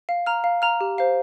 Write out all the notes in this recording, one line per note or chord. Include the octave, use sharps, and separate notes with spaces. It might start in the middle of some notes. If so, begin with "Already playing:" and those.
F5
A#5 F6
F5
A#5 F6
G4
C5 F5